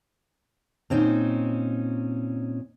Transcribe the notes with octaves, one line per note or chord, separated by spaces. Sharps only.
A#2 C4 C#4 D#4